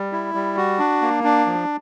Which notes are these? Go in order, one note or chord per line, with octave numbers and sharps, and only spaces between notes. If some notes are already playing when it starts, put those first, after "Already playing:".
Already playing: G3
E4
G3
F#4
D4
A#3
D4
F3